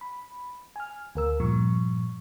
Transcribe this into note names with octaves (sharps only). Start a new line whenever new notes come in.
B5
G#5 F6
D2 A#4 E6
G2 A#2 F3 C#6